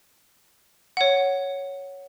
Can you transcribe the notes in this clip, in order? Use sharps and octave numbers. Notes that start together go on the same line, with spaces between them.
C#5 F#5